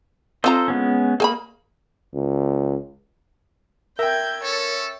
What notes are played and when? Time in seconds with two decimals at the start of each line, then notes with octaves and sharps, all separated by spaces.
0.44 C4 F4 A4 C5 D#5 A#5
0.68 G#3 B3 C#4
1.20 A#3 G#4 G#5 B5
2.14 C#2
3.99 A#4 E5 G5 G6 G#6
4.43 C#4 A4 C#5